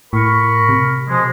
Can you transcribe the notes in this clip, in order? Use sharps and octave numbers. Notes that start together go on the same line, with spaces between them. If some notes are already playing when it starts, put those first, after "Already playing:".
A2 A#4 B5 C#6
C3
B2 F3 G#3